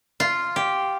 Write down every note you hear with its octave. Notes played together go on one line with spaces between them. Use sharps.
F4
G4